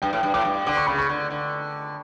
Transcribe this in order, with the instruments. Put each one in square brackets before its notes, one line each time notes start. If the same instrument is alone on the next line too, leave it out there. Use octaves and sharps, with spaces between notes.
[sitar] G2 [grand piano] G5
[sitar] A2
G2
[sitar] A2 [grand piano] D6
[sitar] G2
[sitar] D3 [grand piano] D6
[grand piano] C#6
[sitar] C#3 [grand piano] B5
[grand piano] C#6
[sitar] D3
D3